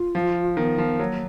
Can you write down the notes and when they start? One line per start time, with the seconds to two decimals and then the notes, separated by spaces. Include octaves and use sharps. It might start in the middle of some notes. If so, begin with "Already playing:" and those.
Already playing: F4
0.15 F3
0.57 D#3 B3
0.78 F3
0.99 F#3 A#3